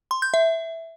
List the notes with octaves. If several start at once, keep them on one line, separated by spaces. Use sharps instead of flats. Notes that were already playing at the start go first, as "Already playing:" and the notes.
C6
G6
E5